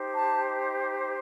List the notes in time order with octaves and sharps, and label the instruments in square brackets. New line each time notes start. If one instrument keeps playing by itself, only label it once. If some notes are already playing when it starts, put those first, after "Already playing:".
Already playing: [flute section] D#4 G4 C5
A5